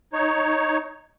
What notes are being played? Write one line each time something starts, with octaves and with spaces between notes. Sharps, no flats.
D#4 C#5